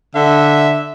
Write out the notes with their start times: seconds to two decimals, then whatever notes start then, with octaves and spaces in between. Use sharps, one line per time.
0.15 D3 E5